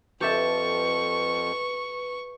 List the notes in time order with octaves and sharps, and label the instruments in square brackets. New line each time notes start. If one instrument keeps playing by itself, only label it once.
[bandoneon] F2 [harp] G4 A4 E5 [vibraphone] B4 [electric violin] C#6